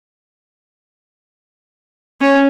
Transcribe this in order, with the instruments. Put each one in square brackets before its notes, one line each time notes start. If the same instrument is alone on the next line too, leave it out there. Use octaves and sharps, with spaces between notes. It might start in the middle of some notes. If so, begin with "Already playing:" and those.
[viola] C#4